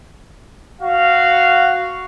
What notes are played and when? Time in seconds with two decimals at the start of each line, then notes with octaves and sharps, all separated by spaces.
0.82 F#4 F5